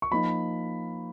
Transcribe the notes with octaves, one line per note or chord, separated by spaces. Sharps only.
C#6
F3 A#3 D#4 B5